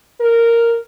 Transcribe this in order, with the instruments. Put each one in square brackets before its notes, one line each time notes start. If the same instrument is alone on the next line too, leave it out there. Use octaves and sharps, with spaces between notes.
[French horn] A#4